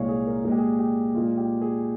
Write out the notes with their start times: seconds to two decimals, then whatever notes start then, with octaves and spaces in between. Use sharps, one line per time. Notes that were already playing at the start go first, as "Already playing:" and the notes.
Already playing: C2 A#2 G#3 C#5 F5
0.08 G#4
0.27 A#4
0.44 A#2 G#4
0.48 G#3 G4
0.58 G#4
0.79 G4
1.14 A#2 G#3 F4
1.37 G4
1.61 G#4